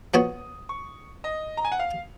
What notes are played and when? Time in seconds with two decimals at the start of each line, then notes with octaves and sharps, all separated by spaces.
0.14 F3 B3 F#4 C#5 D#6
0.69 C#6
1.24 D#5
1.57 A#5
1.65 G#5
1.72 F#5
1.80 F5